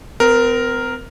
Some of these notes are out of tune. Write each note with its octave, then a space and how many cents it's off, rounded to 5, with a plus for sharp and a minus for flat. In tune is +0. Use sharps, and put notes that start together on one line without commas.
C4 -45 A#4 +0